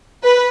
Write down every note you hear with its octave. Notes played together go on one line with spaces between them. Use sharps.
B4